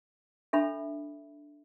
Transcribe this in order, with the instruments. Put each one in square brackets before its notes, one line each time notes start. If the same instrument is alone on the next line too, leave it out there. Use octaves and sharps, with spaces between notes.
[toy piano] D4 A4 E5 B5